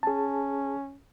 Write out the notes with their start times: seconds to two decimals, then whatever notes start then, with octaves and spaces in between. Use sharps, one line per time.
0.03 C#4 G#4 A5